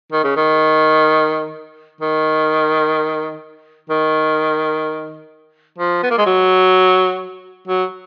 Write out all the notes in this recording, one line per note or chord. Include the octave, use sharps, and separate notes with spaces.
D#3
C#3
D#3
D#3
D#3
F3
B3
A#3
G#3
F#3
F#3